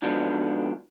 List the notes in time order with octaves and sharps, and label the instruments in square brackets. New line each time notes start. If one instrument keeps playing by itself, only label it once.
[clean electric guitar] G#2 D3 F3 F#3 B3 D4